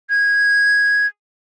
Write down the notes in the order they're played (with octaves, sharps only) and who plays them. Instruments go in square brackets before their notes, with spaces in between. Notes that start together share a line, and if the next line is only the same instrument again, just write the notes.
[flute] G#6